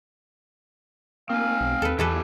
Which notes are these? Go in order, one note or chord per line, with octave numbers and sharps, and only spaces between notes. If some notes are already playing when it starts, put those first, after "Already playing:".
A#3 C4 F5 G#5
B1
D#2 A4 B4
E2 E3 F4 G4 A4 B4 A5